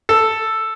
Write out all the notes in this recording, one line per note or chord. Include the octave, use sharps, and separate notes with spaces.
A4